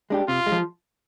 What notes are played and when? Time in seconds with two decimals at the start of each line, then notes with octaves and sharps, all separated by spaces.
0.10 G#3 D4 G4
0.28 C3 F4
0.46 G#3
0.52 F3